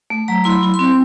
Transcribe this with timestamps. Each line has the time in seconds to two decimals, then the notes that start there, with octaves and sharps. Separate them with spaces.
0.10 A3
0.28 F#3 A#5
0.44 E4 C6
0.50 B5
0.63 E4
0.74 C6
0.79 C4